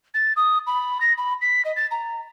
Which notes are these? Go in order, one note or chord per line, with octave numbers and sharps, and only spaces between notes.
A6
D#6
B5
A#6
B5
B6
D#5
A6
A#5